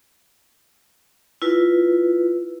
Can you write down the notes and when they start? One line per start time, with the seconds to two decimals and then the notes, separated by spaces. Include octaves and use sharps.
1.42 E4 F4 B4